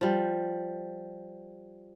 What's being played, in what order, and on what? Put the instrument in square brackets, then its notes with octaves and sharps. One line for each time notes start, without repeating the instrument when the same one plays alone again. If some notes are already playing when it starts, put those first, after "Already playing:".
[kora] F3 G3